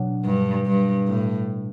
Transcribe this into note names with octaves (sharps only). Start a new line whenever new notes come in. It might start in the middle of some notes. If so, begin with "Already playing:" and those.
Already playing: B2 F#3 D4
G2
G2
A2